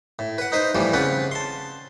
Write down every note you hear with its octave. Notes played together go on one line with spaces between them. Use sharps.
A2
B4 F#5
D#4 B4 C5
A2 E3 F3 G3 A3
C#3 C4 F4 B4 F#5
A5 C6